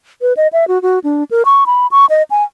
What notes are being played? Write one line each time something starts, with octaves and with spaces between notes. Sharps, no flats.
B4
D#5
E5
F#4
F#4
D4
A#4
C#6
B5
C#6
D#5
G#5